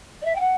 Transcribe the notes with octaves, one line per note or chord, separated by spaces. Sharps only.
D5
E5
G5
F#5